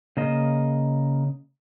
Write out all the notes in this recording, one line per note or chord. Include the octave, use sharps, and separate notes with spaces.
C#3 A#3 D#5